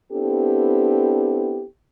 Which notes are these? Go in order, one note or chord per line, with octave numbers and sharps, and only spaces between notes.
B3 C4 D4 E4 G4 A4